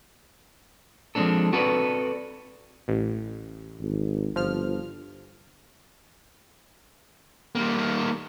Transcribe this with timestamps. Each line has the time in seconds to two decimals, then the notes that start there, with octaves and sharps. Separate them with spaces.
1.15 F3 G#3 B3 C4 D4 A4
1.52 C4 F#4 A4 B4 D5
2.88 A1
3.81 G#1
4.36 G1 F3 F6
7.55 G3 A#3